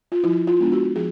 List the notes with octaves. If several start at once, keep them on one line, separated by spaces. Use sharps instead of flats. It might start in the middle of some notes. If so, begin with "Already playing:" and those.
F4
F3 E4
F4
G#3 B3 D4
F#4
F3 G#4